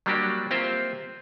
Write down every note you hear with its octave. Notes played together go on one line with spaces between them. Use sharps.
F#3 G3 A#3 D4 F#4 G4
A#3 C4 F4 G4 C5 E5